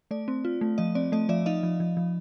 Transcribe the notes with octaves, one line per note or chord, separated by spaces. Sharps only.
A3 D5
C4
F4
A3
F3 D#5
C4 D5
A3 D#5
F3 D5 E5
D#4 D#5 F5
F3
F3
F3